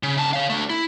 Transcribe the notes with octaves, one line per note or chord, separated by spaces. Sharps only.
C#3
C#3 A5
C#5 F5
D3 A3
E4